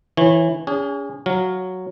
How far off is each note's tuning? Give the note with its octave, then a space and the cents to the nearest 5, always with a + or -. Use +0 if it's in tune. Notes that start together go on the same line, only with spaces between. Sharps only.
E3 +0 C#5 -25
C#4 +40 G#4 -25
F#3 +0 F5 +10